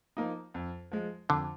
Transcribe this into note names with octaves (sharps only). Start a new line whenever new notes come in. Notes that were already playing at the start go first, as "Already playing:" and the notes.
F3 A#3 D#4
F2
F3 G#3
F2 D3